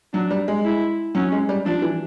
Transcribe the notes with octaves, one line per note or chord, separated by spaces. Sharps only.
F#3 D4
G3
G#3
E4
F#3 C#4
G#3
G3
F3 D4
E3